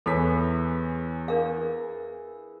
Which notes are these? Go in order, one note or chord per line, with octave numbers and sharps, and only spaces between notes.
E2 E4 G#4 A4 B4 C#5 B6
D4 G#4 A#4 F5